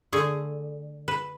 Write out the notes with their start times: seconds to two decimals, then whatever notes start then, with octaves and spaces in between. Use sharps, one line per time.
0.12 D3 A3 G#4
1.08 B4